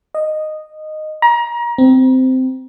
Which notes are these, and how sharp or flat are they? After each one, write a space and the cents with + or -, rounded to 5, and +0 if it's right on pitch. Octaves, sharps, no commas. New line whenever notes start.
D#5 -10
A#5 +30
C4 -15